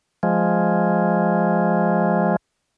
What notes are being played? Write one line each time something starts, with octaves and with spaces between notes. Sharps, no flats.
F3 G#3